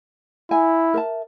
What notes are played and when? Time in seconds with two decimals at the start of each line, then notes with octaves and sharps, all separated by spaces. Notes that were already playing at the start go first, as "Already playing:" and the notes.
0.51 E4 G#5
0.94 A#4 E5 A5